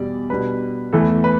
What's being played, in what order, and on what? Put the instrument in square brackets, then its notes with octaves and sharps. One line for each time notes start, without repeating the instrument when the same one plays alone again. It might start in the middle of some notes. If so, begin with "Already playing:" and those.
Already playing: [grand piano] E2 B2 G3 D5
B2 G3 D4 B4
E2 E3 A3 A4
B4